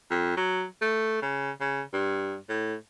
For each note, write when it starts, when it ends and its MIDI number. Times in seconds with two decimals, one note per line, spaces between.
0.10 0.34 41
0.37 0.65 54
0.82 1.22 57
1.22 1.51 49
1.61 1.82 49
1.93 2.35 43
2.49 2.74 45